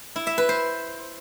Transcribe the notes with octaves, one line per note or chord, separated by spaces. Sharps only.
E4
E5
B4
C5